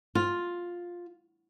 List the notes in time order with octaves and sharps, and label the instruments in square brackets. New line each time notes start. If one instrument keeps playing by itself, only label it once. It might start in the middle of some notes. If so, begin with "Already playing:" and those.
[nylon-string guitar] F4